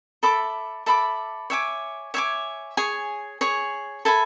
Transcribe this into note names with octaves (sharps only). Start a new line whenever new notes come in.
A4 E5 B5 D6
A4 E5 B5 D6
C#5 E5 G#5 D6
C#5 E5 G#5 D6
G#4 C#5 G#5
G#4 C#5 G#5
A4 E5 G#5 B5